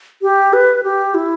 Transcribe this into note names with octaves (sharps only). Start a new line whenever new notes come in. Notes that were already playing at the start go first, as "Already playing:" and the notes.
G4
B4
G4
E4